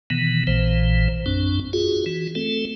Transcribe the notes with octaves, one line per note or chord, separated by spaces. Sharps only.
B2 D#3 E3 B3
A#1 A#2 E3 C5
F#2 C4 D4
F4 F#4 G#4
E3 F#4
A3 C4 A4